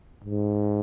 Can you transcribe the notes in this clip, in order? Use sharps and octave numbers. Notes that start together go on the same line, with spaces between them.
G#2